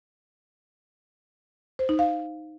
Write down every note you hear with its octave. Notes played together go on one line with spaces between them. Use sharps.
C5
D#4
F5